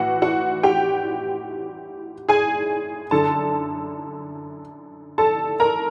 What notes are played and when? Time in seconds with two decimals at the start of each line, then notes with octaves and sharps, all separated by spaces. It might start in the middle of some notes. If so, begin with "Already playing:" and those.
Already playing: A2 E3 F#4 F#5
0.22 F#4 F#5
0.63 G4 G5
2.29 G#4 G#5
3.11 F#2 D3 A4 A5
5.18 A4 A5
5.60 A#4 A#5